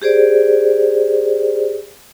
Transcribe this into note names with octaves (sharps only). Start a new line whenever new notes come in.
G4 G#4 C5 D5